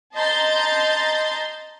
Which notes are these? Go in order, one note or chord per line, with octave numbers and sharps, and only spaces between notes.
D#5 A5 A#5 C6 G6 A6